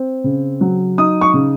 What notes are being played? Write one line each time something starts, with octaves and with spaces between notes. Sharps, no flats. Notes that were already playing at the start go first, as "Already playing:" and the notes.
Already playing: C4
C#3
F#3
D#4 D#6
C#6
C#3